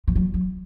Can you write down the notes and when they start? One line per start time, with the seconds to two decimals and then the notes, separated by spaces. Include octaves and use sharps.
0.08 F3
0.16 F#3
0.34 F#3